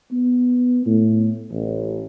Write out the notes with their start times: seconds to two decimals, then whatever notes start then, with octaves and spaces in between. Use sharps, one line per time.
0.13 B3
0.86 A2
1.51 A1